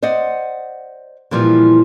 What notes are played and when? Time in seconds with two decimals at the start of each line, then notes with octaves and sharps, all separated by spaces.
0.02 C5 D5 D#5 F#5
1.31 A#2 E3 F3 G3